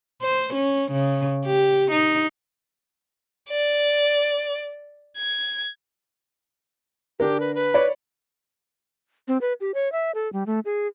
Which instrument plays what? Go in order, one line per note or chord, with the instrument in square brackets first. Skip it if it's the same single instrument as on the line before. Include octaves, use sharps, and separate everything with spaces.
[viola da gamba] C5
C#4
C#3
G4
D#4
[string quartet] D5
G#6
[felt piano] D3 D4 A#4 [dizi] G4
[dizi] B4
B4
[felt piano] C#5 D5 B5
[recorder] C4
B4
G4
C#5
E5
A4
G3
A3
G#4